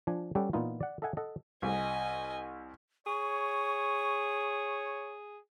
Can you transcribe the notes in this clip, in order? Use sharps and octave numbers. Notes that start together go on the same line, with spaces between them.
F3 D4 G#5
G3 C#4 G4 A4 F#5
A#2 E3 B3 D#4 F4
D5 F#5
A4 D#5 E5 F#5 G#5
A4 D#5 F#5
C2 D#5 G#5
G#4 C#5 C#6